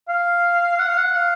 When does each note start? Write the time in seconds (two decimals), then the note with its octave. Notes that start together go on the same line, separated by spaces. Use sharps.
0.09 F5
0.79 F#5
0.88 F5
0.98 F#5
1.15 F5